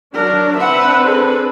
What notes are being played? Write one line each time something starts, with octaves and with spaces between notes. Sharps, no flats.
F#3 D4 A#4
C4 D4 B4 E5 F#5
G#4 A4